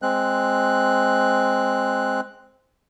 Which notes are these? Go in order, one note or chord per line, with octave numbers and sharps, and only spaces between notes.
G#3 C4 F#6